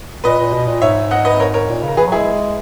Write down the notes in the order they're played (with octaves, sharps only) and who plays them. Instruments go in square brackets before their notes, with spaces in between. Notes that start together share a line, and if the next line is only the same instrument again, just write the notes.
[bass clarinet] A#2 [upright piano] B4 D#5
[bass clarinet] A#2
B2
A#2
[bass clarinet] G#2 [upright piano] C#5 E5
[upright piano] D#5 F#5
B4 D#5
A#4 C#5
A#4 C#5
[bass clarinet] A#2
C#3
[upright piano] A#4
[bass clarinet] E3 [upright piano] G#4 B4
[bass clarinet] F#3
[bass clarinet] G#3 [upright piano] E4 G#4